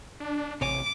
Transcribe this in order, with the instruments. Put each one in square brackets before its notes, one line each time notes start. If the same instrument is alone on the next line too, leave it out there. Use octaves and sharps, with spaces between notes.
[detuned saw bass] D4
[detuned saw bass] A1 [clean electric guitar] C3 C#5 G#5 [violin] D6